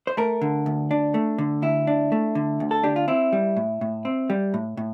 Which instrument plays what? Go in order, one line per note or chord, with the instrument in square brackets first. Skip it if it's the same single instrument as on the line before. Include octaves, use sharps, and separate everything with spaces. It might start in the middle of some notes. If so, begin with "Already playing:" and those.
[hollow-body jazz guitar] C5
A3 A#4
D3
D2
D4
A3
D3
D2 E4
D4
A3
D3
D2
A4
D4 G4
F4
C4 E4
G3
A2
A2
C4
G3
A2
A2